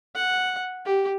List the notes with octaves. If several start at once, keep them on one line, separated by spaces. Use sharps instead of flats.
F#5
G4